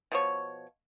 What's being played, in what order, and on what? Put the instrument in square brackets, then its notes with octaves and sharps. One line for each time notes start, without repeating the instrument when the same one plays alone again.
[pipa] B2 F3 C#5